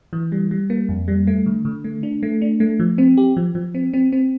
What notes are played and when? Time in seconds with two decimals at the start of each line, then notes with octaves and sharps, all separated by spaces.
0.13 E3
0.32 G3
0.51 G3
0.70 A#3
0.89 F2
1.08 G3
1.27 A3
1.46 D3
1.65 D3
1.84 A3
2.03 D4
2.23 A3
2.41 D4
2.60 A3
2.80 F3
2.98 C4
3.17 G4
3.37 F3
3.55 F3
3.74 C4
3.93 C4
4.12 C4